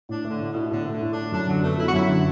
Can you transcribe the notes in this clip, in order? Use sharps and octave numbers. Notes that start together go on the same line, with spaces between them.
A2 D4
D3 A3
A2
B2 E4
A2 D3
D3 A3
A2
D4 E4
F#2 D4
D3 F#3
A3 B3
F#3 E4
F#4
F#2 E4
D3